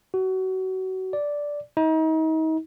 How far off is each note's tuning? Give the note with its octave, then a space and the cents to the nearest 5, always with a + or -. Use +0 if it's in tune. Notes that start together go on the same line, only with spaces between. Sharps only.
F#4 +25
D5 -5
D#4 +35